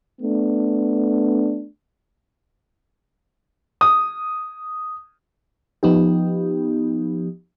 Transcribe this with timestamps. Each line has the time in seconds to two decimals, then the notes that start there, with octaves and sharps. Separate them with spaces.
0.21 A3 B3 D4
3.81 D#6
5.83 F3 B3 D#4 G4